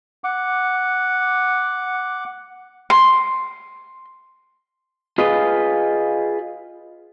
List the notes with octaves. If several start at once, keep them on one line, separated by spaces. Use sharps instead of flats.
F#5 D6
C6
F4 G#4 B4 D#5